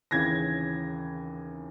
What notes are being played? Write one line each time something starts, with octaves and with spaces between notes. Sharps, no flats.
D#2 C#3 E3 G#6 A#6